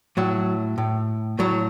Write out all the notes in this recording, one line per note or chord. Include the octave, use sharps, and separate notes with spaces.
A2 F#3
A2
A2 F#3